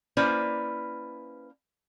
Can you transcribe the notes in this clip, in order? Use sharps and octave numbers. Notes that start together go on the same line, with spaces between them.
A#3 C#4 E4 B4 C5 D5